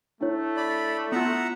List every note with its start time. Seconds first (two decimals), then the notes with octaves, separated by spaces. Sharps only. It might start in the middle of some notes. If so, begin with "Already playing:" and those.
0.21 A3 D4 E4 C#5
0.57 D5 B5
1.12 B3 F4 E5 F#5 A#5